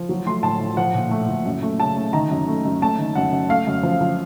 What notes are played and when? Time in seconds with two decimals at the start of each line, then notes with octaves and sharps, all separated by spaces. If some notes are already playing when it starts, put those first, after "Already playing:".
Already playing: F3
0.09 F#3
0.26 A3 C6
0.43 A2 A5
0.60 A2
0.77 F3 F#5
0.94 A#2
1.11 A3
1.29 A#2
1.45 F#2
1.63 A3
1.80 C#3 A5
1.97 A3
2.13 D#3 A#5
2.31 F#2
2.48 A3
2.65 F#2
2.82 A3 A5
2.98 D#3
3.16 F#2 F#5
3.33 F#2
3.49 A3 F5
3.67 F#2
3.83 F3
4.01 F3